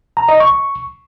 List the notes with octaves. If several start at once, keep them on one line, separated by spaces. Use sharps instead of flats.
A#5
D#5
C#6